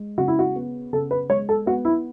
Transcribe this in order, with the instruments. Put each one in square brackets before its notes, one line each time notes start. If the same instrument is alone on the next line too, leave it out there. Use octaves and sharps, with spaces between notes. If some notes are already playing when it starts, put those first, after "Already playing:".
Already playing: [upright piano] G#3
C#3 F#4
E4
F#4
B3
C#3 A4
B4
G#3 C#5
A4
B3 F#4
E4